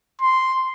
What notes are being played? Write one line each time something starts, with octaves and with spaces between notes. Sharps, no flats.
C6